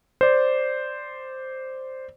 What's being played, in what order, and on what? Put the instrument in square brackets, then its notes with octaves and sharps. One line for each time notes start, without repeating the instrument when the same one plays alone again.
[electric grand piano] C5 D5